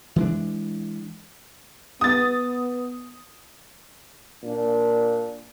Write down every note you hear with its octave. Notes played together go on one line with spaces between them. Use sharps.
E3 G#3 D4
B3 D#6 A6
A#2 D4